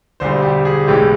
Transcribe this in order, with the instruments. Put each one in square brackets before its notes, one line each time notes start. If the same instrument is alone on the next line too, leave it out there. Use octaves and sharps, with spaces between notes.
[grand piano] E1 D2 D3 G3 C5
G4
G#4
B1 A2 E3 G#3 G4